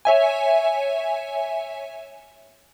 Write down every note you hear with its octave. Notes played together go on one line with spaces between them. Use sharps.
C#5 E5 G#5